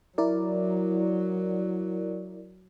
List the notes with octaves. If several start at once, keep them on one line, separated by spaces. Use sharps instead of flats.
F#3 E4 A#4 D5